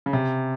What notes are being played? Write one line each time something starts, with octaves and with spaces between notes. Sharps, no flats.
C#3
C3